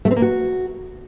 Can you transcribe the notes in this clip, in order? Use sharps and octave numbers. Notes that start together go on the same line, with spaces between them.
A3
C4
A#3
F#4